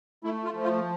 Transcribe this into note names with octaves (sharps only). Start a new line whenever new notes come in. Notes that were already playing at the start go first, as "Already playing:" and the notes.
A3 E4
F4
F3
F4